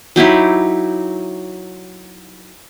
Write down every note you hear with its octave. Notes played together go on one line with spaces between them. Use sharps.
F#3 D#4 E4 G4